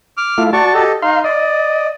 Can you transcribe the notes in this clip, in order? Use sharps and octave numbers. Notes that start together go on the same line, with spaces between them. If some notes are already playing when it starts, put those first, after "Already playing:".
D6 F6
A3 E4 F4
F#4 D5 A5 C#6
G4 A4 D#5
D#4 F5 C6
D5 D#5